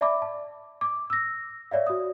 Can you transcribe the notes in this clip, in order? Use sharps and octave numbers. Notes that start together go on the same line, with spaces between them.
D5 E5 A5 B5 D6
A5
D6
E6 A#6
C#5 D5 E5 F5
F#4 D#6